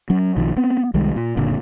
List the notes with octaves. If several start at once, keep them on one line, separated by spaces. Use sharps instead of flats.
F#3 C#4
B1 D#3 F3
B3 C4
C2 D#3 G3 G#3
A#2
F#1 A#2 D3